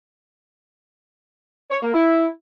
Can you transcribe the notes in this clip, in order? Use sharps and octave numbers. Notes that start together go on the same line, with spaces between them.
C#5
A#3
E4